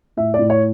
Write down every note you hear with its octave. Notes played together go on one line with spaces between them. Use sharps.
A2 E5
D5
A2
C#5